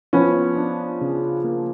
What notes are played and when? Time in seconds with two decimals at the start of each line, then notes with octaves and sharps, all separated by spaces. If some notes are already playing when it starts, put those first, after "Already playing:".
0.13 F3 B3 C#4
0.57 D4
1.01 C#3
1.44 A#3